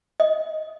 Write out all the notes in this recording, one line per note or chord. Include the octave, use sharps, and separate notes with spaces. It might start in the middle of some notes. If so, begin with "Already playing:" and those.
D#5